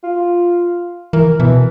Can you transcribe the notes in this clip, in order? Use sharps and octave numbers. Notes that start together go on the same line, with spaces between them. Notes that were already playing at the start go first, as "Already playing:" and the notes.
F4
E3 A#4
B2 E3